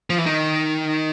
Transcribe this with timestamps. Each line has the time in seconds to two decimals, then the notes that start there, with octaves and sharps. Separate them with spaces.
0.10 F3
0.18 E3
0.26 D#3